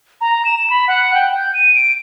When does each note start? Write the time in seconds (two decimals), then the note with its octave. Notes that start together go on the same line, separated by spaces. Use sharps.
0.21 A#5
0.45 E7
0.70 B5
0.88 F#5
1.14 G5
1.37 G6
1.54 D#7
1.75 D7